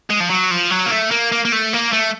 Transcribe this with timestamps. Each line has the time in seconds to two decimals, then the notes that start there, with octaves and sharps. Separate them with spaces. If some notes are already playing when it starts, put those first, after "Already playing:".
0.10 G#3
0.20 F3
0.30 F#3
0.51 F3
0.70 F#3
0.86 A#3
0.91 A3
1.11 A#3
1.32 A#3
1.45 A#3
1.52 A3
1.73 A#3
1.92 A3